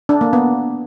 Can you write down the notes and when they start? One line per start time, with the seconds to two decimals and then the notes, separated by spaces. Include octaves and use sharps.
0.09 D4
0.21 A#3
0.33 B3